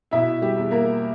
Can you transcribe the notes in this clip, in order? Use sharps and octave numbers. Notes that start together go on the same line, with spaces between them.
B2 E4 E5
G3 G4
E2
A#3 A#4